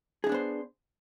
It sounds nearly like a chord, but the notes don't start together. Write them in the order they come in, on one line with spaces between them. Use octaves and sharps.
G#4 D#4 D4 B3 C5